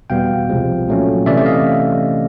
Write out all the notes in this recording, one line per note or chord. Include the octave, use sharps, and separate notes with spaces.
E2 B2 G3 B3 F5 G5
C2 C3 F3 G#3
A#2 F#3 A3 C#4
C3 E3 A3 C#4 D5 E5
E5
D#5 F5